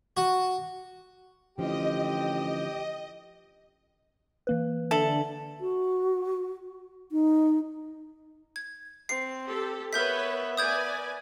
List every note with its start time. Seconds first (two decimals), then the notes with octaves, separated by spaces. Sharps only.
0.17 F#4
1.58 A1 D3 F3 G4 D#5 G5
4.47 E3 A#3 B4
4.91 D3 A4 E5 F#7
5.60 F#4
7.12 D#4
8.56 G#6
9.09 C4 C7
9.46 G4 A4
9.93 B3 A#4 B4 C#5 E5 G6 B6
10.57 B4 D5 G#5 D#6 G6 G#6